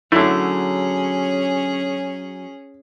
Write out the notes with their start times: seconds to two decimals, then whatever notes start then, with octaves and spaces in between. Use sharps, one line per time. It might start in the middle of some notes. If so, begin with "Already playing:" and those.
0.12 D3 F#3 A3 C#4 E4 G#4